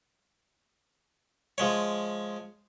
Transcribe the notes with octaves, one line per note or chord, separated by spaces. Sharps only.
F3 G#3 C#5